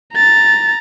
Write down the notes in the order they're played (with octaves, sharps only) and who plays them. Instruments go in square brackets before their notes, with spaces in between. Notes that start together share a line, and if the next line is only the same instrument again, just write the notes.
[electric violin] A#5 A6